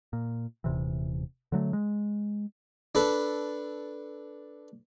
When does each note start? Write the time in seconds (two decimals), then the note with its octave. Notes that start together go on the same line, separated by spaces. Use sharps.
0.13 A#2
0.64 D#1 C3 E3
1.52 D3 F#3 A3
1.73 G#3
2.95 D4 A4 B4